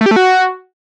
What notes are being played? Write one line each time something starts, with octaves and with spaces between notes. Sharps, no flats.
A3
G4
A3
F#4